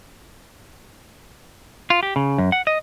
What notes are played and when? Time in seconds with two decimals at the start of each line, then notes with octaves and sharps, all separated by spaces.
1.90 F4
2.03 G4
2.16 C#3
2.38 F#2
2.52 F#5
2.67 D#5